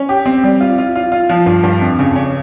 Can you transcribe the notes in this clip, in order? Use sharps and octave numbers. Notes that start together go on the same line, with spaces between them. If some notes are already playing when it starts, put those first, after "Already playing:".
Already playing: C#4
G4
C4
G3
F4
F4
F4
F4
F3
G2
G2
F2
C#3
C#4